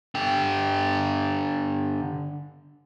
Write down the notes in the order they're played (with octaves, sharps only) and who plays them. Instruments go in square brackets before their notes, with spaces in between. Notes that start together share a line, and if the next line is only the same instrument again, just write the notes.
[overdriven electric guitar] D3 G4